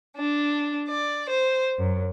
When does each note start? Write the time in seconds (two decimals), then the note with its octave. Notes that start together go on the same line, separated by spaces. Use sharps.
0.16 D4
0.89 D5
1.29 C5
1.78 F#2